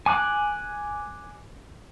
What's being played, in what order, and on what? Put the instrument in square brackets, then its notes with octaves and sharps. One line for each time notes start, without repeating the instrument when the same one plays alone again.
[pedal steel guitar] G#5 D6 F#6